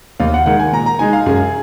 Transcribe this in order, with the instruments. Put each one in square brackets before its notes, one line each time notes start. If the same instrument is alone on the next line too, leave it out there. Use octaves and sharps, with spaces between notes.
[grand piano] D#2 F5
F#5
D#3 G#3 F#5
G#5
A#2 A#5
A#5
G#3 D#4 G#5
F5
F#2 G#4